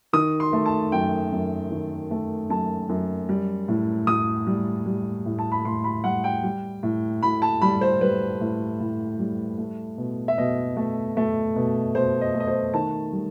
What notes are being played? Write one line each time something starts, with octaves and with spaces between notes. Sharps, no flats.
D#3 D#6
C6
A3
A5
F#2 G5
F#2
D#3
A3
F#2 A5
F#2
G3
A2
A2 D#6
G3
G3
A2
A5
B5
A2 C6
B5
G3 F#5
G5
G3
A2
A2 B5
A5
G3 B5
C5
G3 B4
A2
A2
G3
A3
B2
E5
B2 D#5
A3
A3
B2
B2 C5
D#5
A3
D#5
C5
D#3 A5
G3